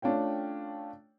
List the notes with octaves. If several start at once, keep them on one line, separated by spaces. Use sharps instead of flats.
A3 C#4 D4 F4 C#5 G5